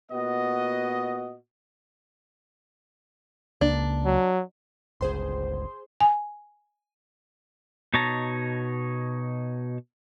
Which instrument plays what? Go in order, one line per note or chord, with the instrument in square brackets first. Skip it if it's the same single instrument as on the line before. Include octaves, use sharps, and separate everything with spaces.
[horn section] A#2 B3 F#4 D#5
[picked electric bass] C#2 A#3 [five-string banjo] D4
[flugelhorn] F#3
[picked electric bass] G1 C#2 [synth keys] G#4 C5 C6
[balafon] G#5
[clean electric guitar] B2 D#4 C#5 A5 A#5